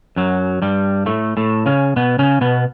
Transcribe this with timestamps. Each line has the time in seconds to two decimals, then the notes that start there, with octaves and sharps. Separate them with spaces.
0.16 F#2 F#3
0.62 G2 G3
1.06 A2 A3
1.37 A2 A3
1.66 C#3 C#4
1.96 B2 B3
2.19 C#3 C#4
2.41 B2 B3